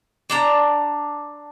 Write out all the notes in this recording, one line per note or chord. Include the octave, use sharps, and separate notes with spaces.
D4 A5 A#5